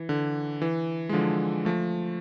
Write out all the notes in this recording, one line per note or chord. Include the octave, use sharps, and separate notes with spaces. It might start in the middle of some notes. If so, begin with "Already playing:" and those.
Already playing: E3
D3
E3
G#3
D3 F3
F3 A3